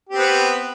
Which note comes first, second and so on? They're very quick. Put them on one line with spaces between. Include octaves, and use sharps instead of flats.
G4 C4 B3